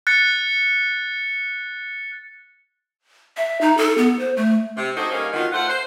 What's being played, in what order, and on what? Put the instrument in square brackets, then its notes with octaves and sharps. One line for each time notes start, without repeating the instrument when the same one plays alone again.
[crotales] F#6 A6 C#7
[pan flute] E5
D#4
A4
B3
C5
A3
[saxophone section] C3 C4
D4 D#4 F#4 G#4 A4 C5
G3 A#3 C#4 D#4 F5
D3 D#3 B3 F4 F#4
A3 F4 C5 F#5
C5